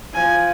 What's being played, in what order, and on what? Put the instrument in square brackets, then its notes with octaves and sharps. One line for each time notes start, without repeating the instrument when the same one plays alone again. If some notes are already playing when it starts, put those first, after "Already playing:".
[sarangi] F3 [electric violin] G#5